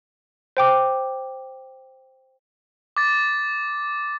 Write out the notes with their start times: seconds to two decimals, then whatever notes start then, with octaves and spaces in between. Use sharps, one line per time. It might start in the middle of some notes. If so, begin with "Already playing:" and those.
0.57 C5 G5 D6
2.97 D6 A6